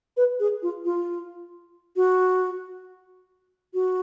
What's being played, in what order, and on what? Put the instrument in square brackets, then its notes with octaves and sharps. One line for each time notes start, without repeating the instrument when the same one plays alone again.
[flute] B4
G#4
F4
F4
F#4
F#4